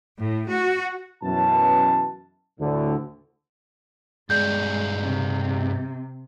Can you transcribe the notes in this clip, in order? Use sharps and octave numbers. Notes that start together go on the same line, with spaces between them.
A2
F#4
F#2 B2 E3 A5
D2 A2 D3
G2 G#3 G#4 D5 G6
C3